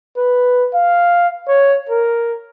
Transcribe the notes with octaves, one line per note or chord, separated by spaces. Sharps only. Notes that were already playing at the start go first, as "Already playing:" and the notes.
B4
F5
C#5
A#4